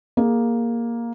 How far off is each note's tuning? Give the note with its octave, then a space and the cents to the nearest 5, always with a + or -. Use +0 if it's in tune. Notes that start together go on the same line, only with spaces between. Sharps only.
A#3 +5 G#4 +0